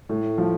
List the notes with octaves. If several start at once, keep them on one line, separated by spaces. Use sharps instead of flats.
A2
F3